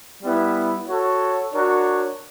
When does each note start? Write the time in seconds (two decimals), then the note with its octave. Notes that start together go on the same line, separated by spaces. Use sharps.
0.23 G3 B3 E4
0.89 F#4 A4 C#5
1.54 D4 F#4 A#4 C#5